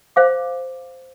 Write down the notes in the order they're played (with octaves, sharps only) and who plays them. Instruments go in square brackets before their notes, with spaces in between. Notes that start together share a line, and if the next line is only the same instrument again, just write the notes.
[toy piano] C5 F5 D6